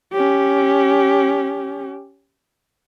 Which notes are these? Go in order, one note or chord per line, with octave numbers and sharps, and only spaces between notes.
C#4 G4